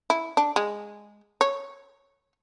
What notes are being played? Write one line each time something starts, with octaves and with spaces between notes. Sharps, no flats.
E4
D4
G#3
C#5